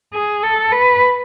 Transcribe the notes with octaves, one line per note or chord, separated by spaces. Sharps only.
G#4
A4
B4